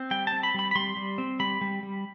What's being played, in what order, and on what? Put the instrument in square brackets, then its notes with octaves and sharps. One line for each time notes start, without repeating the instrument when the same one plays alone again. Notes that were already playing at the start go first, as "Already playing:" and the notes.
Already playing: [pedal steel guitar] C4
G3 G5
A5
C4
B5
G3 B5
B5
G3 C6
G3
C4
G3 B5
G3
G3